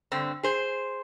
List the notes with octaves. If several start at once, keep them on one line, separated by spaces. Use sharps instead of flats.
G2 D3 C4
G#4 C5